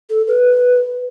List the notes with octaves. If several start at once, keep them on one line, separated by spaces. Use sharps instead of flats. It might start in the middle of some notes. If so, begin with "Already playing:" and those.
A4
B4